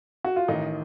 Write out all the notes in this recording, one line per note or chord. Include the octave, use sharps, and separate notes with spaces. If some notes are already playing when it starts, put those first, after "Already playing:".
F#4
F4
A1 D#3 D#4